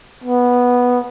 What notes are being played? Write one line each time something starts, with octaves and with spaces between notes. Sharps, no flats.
B3